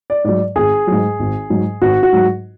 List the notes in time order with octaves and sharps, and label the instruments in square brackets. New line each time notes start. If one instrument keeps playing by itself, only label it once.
[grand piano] D5
G#2 F#3 D5
G#1 G#4
G#2 F#3
G#1
G#2 F#3
G#1 F#4
F#4
G#2 F#3